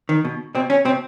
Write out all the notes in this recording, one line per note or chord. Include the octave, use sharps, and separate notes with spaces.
D#3
B2
B2 C4
C#4
B2 C4